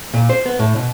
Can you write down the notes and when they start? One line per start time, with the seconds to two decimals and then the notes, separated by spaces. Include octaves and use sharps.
0.14 A#2
0.29 C5
0.46 B3
0.59 A2
0.76 B2